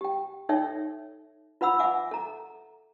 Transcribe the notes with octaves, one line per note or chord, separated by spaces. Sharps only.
G4 G5
D#4 A4 C#5 E5 G5
F4 B4 F#5 B5 E6
E5 F#5 G#5 D6
A4 A#5